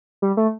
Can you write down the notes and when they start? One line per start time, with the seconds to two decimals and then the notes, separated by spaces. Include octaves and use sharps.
0.22 G3
0.37 A3